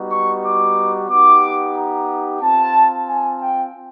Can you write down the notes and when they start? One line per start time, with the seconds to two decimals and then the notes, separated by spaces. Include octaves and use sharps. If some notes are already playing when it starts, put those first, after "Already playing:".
Already playing: G3 B3 D#4 F#4
0.10 C#6
0.44 D6
1.09 B3 D#4 G4 D6
1.76 A#5
2.41 C4 F4 A5
3.07 G#5
3.40 G5